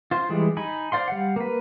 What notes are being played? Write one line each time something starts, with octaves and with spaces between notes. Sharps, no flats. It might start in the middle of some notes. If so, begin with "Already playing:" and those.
F4 C5
E3 G3 G#3
D#4 G#5 B5
C5 D5 F5 C6
G3 F5 F#5
A#3 B4